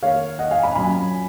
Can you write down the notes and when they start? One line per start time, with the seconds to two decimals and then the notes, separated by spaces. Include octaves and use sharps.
0.02 D#3 A#3 D#4 C#5 F5
0.39 D#5 F#5
0.51 F5 G#5
0.63 G#5 B5
0.75 A#2 F#3 C#4 G#5 B5